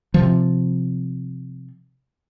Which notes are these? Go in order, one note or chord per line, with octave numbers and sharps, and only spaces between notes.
C3 F3